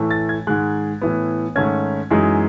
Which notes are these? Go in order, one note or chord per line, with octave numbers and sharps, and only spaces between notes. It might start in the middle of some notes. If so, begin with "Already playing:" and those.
Already playing: A2 E3 A3
A6
G#6
G#2 D#3 G#3 F#6
A2 E3 B3
G#2 D#3 A3 C#4 G#6
F#2 E3 G#3 D#4